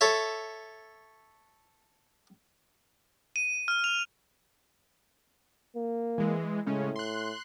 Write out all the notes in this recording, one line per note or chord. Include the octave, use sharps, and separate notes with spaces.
A4 C#5 E5
D#7
F6
F7
A#3
E3 G#3
A2 C#3 G#3 C#4
C6 F#6